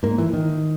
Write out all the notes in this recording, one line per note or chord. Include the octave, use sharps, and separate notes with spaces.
G#2 A#3
E3
D#3